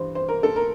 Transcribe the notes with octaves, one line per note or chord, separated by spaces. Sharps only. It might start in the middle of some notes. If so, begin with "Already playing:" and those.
Already playing: G2 E3 C5
C5
A#4
A4
A#4